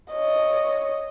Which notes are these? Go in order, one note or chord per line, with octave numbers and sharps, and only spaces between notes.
C#5 D#5